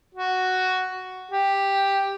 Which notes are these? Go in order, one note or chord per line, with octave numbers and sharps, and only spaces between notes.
F#4
G4